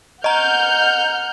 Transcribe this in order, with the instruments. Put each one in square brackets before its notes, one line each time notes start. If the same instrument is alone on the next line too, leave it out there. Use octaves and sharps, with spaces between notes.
[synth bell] D#5 A#5 [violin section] F#5 F6 G6